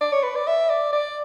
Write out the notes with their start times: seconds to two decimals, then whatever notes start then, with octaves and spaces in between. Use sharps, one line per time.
0.01 D5
0.12 C#5
0.23 B4
0.36 D5
0.47 E5
0.70 D5
0.93 D5